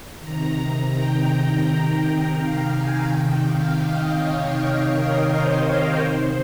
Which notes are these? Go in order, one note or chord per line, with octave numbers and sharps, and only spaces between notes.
C3 D#3 A#5
G5
G5
F5
G#5
C3 D#3 G5
F5
D#5
C#5
D#5
A#4
C5
C#5
C3 D#3 C5